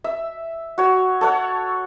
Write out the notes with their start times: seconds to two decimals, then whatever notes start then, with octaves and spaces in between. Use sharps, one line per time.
0.04 E5
0.78 F#4 C#5
1.21 A4 C#5 F#5